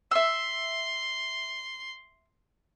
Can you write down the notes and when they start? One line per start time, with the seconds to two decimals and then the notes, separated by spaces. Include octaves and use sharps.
0.11 E5 C6 E6